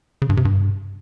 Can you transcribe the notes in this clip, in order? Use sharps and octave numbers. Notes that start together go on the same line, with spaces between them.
C#3
G2
C3
G2